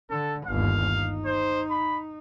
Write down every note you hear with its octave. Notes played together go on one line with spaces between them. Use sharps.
D3 A4
G1 D#2 F5
D#4
C5
B5